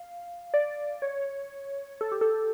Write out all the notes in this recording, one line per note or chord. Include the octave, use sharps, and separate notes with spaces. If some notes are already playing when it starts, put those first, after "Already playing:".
Already playing: F5
D5
C#5
A4
G4
A4